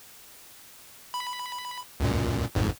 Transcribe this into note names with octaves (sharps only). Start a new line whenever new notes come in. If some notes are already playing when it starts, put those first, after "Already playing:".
B5
C#2 F#2 A#2
G#1 F2 G#2